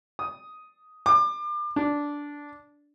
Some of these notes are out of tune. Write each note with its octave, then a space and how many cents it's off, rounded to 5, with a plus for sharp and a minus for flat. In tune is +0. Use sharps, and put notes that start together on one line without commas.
D#6 +5
D6 +35
D4 -10